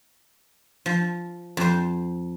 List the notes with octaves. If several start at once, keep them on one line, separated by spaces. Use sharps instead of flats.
F3
F2 C5